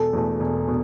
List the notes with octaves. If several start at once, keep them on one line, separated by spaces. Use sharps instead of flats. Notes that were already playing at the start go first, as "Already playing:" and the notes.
Already playing: E1 A4
E2 B2 A3
E1
B2